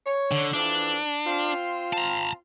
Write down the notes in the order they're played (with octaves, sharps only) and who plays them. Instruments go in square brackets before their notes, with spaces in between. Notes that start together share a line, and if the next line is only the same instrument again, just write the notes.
[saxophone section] C#5
[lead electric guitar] D3
[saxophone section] F2 E3 [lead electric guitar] D4
[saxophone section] C4 F4
[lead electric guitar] A5 A#5